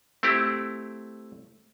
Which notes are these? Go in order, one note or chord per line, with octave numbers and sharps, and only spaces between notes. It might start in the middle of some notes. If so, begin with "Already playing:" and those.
A3 C4 E4 G4